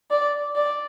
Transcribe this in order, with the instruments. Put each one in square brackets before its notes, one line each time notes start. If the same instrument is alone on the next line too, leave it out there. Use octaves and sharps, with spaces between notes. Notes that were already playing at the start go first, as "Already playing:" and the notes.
[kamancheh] D5
D5